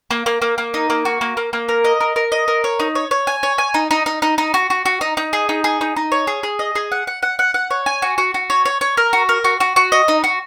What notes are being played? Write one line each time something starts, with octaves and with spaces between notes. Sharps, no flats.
A#3
A#3
A#3
A#3
D#4
A#3
F#4
A#3
A#3
A#3
A#4
D#5
A#4
A#4
D#5
A#4
C#5
D#4
C#5
C#5
G#5
C#5
G#5
D#4
D#4
D#4
D#4
D#4
F#4
F#4
F#4
D#4
D#4
G#4
D#4
G#4
D#4
D#4
C#5
G#4
G#4
D#5
G#4
F#5
F#5
F#5
F#5
F#5
C#5
G#5
F#4
F#4
F#4
C#5
C#5
C#5
A#4
F#4
A#4
F#4
F#4
F#4
D#5
D#4
F#4